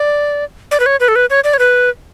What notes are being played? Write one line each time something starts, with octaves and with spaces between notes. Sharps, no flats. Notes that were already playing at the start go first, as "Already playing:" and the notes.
Already playing: D5
D5
B4
C#5
B4
A4
B4
C#5
D5
C#5
B4